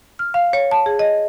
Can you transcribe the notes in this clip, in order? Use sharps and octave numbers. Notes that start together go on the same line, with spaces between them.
F6
F5
C#5
A5
G#4
D#5